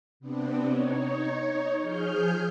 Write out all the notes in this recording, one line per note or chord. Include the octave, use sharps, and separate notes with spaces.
C3 B3 C4 D4
D#4 C#5
F3 G#4 F6 G6